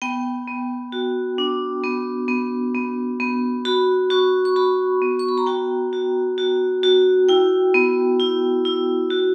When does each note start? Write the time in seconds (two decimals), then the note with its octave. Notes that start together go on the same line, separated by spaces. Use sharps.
0.02 B3 G5
0.47 B3
0.92 F#4
1.38 D4
1.84 B3
2.28 B3
2.74 B3
3.20 B3
3.65 F#4 B5
4.10 F#4 C#6
4.45 C#6
4.56 F#4 B5
5.02 B3
5.19 C#6
5.29 B5
5.38 A#5
5.46 F#4 G5
5.93 F#4
6.38 F#4
6.83 F#4
7.29 E4 G5
7.74 B3
8.20 E4
8.65 E4
9.10 F#4